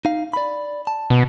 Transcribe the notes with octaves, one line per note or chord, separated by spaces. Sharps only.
D#4 F5
D5 B5
A5
B2